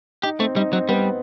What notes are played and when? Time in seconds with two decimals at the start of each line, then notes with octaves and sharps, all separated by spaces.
0.23 D#4 G4
0.40 A3 C4
0.56 G3 D#4
0.73 F#3 C4
0.89 G3 B3